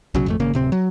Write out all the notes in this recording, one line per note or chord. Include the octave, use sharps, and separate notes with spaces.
B1 C#3 F#3
G#1 F2 A3
G#1 C#3 A#3
D1 C3 C4
F#3